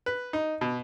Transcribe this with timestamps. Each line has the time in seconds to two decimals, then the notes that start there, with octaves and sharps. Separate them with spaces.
0.06 B4
0.33 D#4
0.61 B2